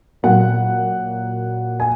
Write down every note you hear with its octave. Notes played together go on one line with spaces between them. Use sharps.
A#2 F#3 A#3 F#5
G#5